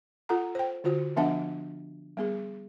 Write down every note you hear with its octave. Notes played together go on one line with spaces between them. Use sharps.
F4 A4 F#5 A#5
C5 G5
D3 F4 F#4 C5
F3 B3 D4 E5 F#5 A5
G3 B3 G#4